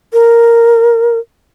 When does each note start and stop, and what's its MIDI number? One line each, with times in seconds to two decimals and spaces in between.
0.13 1.18 70